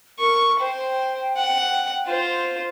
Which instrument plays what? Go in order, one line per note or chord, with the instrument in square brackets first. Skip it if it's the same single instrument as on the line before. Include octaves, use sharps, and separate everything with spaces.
[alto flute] A#4 [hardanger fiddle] C#6
[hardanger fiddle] C5 [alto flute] G5
[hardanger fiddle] F#5
F4 C5